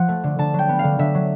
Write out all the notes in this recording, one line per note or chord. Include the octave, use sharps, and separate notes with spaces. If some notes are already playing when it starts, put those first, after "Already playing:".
Already playing: F3 F#5
A3
D3
D3 A5
F#3 G5
B3
D3 F5
D3 E5
F#3